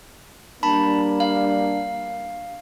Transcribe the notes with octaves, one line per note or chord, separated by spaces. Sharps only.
G3 A#3 D4 A5 B5
F5